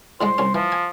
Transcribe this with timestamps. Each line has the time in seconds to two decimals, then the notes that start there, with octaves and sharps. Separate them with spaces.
0.21 A2 D3 G#3 C5
0.38 C2 C#4
0.55 E3 F3
0.72 G#5